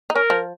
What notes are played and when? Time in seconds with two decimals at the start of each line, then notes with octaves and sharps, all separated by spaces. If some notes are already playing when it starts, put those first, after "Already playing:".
0.10 D#4
0.15 C#4 A#4
0.30 F3